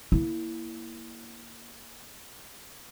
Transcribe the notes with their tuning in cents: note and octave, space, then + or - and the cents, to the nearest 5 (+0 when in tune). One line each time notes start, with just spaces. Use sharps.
A#3 +0 E4 -5